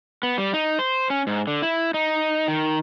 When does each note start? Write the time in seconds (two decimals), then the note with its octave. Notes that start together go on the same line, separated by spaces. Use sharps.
0.23 B3
0.38 G3
0.54 D#4
0.79 C5
1.10 C#4
1.27 G#2
1.47 D3
1.62 E4
1.94 D#4
2.48 D#3